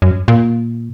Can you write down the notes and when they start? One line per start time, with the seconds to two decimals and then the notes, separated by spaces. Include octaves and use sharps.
0.02 F#2
0.28 A#2